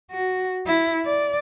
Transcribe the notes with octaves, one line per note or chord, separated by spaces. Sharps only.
F#4
E4
D5